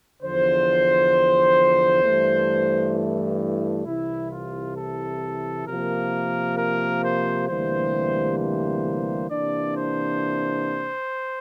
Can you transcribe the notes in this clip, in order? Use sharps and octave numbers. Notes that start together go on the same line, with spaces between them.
E2 D3 F3 C5
G2 E3 A3
E4
C2 C3 E3 E4
F4
A4
C3 F3 A#3 A#4
A#4
C5
D2 C3 E3 G3 A#3 C5
C5
C3 E3 A#3 D4 D5
C5